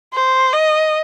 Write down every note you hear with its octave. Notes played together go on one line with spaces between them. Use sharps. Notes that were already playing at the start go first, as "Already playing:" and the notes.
C5
D#5